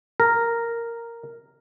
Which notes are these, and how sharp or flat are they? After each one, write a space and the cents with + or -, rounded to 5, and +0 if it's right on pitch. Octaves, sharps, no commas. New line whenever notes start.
A#4 -5